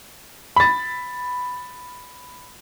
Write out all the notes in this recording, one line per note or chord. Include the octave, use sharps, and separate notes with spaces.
B5 A6